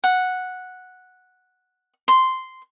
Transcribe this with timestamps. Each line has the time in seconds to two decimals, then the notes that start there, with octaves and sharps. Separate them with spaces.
0.04 F#5
2.08 C6